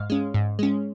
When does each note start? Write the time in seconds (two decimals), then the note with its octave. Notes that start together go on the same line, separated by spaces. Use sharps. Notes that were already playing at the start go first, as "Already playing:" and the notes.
Already playing: G#2 F5
0.10 G#3 C#4
0.34 G#2
0.59 G#3 C#4